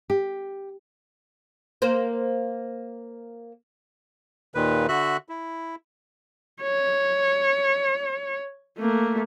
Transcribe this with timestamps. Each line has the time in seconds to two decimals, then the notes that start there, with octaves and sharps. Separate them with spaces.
0.10 G4
1.82 A#3 C5
4.55 D#2 A#2 D#3 B4
4.88 D3 F#4 E5 F#6
5.29 E4
6.62 C#5
8.79 A3 A#3